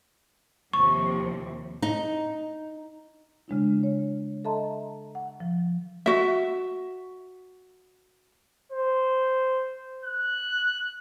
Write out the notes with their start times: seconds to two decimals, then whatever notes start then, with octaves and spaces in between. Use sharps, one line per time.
0.73 D#2 C3 F3 C#6
1.82 D#4
3.48 C#3 G#3 D4 E4
3.83 C#5
4.45 A4 D#5 E5 A5 A#5 C6
5.15 F#5
5.40 F3
6.06 F#4 E5
8.72 C5
10.05 F#6